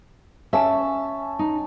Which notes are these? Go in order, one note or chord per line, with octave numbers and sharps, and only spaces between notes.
C#4 E5 A5 E6
D#4